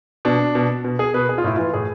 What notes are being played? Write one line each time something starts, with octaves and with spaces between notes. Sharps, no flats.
B2 D4
B2
B2
G#4
B2 B4
G#4
F4
A2 E4
E3 F4
A2 G#4